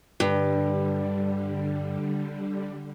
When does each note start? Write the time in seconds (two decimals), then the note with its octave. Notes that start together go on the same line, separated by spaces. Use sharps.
0.20 G2 D3 G3